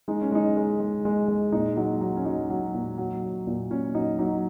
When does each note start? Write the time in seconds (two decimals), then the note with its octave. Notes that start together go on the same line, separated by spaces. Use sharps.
0.08 G#3 D#4
0.22 C#4
0.32 G#3 D#4
0.56 G#3
0.80 G#3
1.05 G#3
1.28 G#3
1.52 A#2 D#4
1.77 F#3 D#4
2.01 F#3
2.17 C#4
2.25 F#3 D#4
2.50 F#3
2.74 A#2
2.98 F#3
3.23 F#3
3.47 A#2
3.71 A#2 C#4
3.95 F#3 D#4
4.19 F#3 D#4